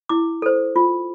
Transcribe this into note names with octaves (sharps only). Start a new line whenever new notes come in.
E4 D6
A4 C5
F4